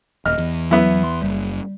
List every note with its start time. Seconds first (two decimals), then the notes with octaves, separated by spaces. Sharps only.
0.26 D#1 D#5 F6
0.38 E2
0.71 F#3 B3 E4
1.04 C6
1.22 F#1 G3